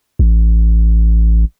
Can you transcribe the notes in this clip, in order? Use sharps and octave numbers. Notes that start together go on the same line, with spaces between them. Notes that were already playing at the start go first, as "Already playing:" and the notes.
A1